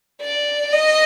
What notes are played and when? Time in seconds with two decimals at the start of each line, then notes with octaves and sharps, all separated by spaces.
0.21 D5
0.73 D#5